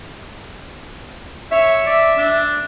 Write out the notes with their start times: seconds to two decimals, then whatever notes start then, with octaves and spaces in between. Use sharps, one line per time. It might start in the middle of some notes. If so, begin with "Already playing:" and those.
1.52 C#5 E5
1.86 D5
2.17 D4